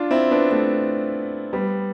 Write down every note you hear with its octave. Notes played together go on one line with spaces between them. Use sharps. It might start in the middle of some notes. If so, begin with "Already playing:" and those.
Already playing: D4 F4
C4 E4
B3 D4
A3 C4
G3 B3